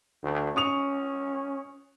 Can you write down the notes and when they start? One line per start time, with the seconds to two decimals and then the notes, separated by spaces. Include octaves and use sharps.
0.23 D2
0.56 C#4 C#6 D#6 F7